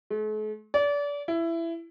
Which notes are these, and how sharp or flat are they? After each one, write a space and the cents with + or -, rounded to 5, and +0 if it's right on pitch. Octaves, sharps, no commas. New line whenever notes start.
A3 -45
D5 -30
E4 +15